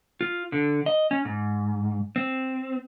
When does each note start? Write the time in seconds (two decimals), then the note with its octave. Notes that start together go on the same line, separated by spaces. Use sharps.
0.21 F4
0.52 D3
0.86 D#5
1.11 C#4
1.25 G#2
2.16 C4